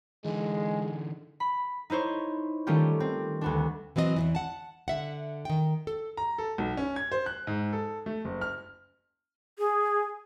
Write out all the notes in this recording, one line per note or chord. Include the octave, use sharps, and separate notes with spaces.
D3 E3 G#3
B5
D#4 E4 C5 C#5
D#3 G3 A3 C#4 F4 G4
C4
D2 B3 D4
E3 F#3 C4 D5 D#5
E2 C#3 E3
F#5 A5
D3 E5 F#5
D#3 G5
A4
A#5
A4
B1
C#4
G#6
C5
F#6
G#2
A4
A3
F#1
F6
G#4